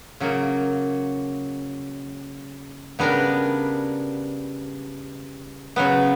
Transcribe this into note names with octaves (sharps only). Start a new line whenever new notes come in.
C#3 F#3 A#3
C#3 G3 B3 D4 A#4
C#3 F#3 B3